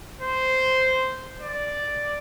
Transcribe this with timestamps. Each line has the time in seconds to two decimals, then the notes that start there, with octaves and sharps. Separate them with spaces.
0.21 C5
1.41 D5